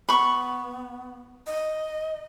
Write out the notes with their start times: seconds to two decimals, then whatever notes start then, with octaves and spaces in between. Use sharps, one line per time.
0.09 B3 B5 C#6
1.47 D#5